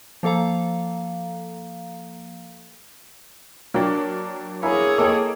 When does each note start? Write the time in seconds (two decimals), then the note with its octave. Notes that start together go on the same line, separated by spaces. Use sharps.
0.23 F3 A#3 A4 F5 A#5
3.74 F#3 A#3 D4 G5
4.62 A#3 E4 G#4 C#5 G#5
4.98 A#3 A4 D#5 G5